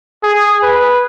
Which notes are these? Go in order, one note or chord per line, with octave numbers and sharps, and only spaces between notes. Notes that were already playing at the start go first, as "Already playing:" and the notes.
G#4
B4